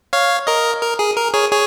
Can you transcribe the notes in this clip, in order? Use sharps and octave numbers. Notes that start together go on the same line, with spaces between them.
C#5 F5
A#4 D#5
A#4
G#4
A#4
G#4 C#5
G#4 C#5